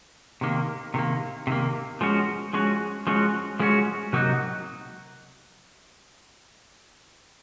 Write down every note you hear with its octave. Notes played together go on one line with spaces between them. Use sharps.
C3 D#3 A#3
C3 D#3 A#3
C3 D#3 A#3
F3 G#3 C#4 F#4
F3 G#3 C#4 F#4
F3 G#3 C#4 F#4
F3 G#3 C#4 F#4
C3 F#3 A#3 D#4 F#4